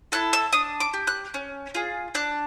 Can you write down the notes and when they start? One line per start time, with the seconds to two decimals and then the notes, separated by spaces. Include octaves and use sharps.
0.12 E4 A4 F#6
0.33 E6
0.53 D4 D#6
0.80 D6
0.94 G4
1.07 F#6
1.34 C#4
1.75 F4 G#4
2.15 D4 F#6